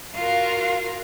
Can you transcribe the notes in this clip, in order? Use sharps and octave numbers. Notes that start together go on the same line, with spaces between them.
F4 F#4 A#4 F5